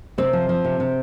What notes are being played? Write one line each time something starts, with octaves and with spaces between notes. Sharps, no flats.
C3 C4
F3
F3
C3
C3